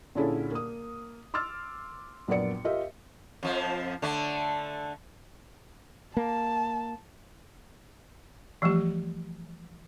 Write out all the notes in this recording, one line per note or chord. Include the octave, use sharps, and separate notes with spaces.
A#2 D3 C#4 E4 G#4 A4
A#3 D#6
C6 D6 E6 F6 A6
A#1 F#2 B3 A#4 D5 C#7
F4 G4 A#4 D#5 E5
F2 F3
D3 A3
A#3 A5
E3 F3 G3 A3 G4